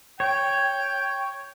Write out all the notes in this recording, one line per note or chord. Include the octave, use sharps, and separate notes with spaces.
C#5 G5